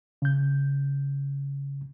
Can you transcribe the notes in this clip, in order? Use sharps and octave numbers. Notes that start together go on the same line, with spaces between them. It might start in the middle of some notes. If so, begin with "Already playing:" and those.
C#3 G6